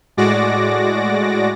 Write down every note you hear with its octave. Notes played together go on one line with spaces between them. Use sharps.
A2 G#3 F#4 D5 D6 A#6